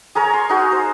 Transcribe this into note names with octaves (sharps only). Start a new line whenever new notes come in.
G#4 A#4 C#5 A#5
C6
D#4 F#4 G#4
C5